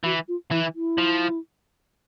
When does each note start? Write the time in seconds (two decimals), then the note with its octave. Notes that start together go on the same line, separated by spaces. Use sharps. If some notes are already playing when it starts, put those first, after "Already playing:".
0.04 E3 F#4
0.28 F4
0.51 E3 E4
0.75 E4
0.98 F3